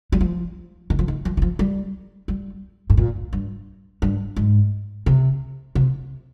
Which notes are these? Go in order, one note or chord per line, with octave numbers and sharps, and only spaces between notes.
G3
F3
D#3
F3
D#3
F3
D#3
F3
G3
G3
G#2
A#2
G2
G2
G#2
C3
C3